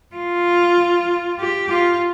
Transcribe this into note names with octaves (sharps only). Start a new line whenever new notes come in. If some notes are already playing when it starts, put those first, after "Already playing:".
F4
G4
F4